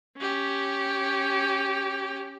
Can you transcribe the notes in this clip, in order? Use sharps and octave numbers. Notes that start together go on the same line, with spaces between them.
C#4 G4